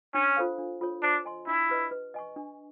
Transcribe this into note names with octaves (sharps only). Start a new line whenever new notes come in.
C#4 D4
F4 A4 C5 F5
D4
F4 A4 C#5
D4 C5
D#5 G#5 C6
D4 E4
G4 B4 D#5
B4
D#5 G#5 C#6
D4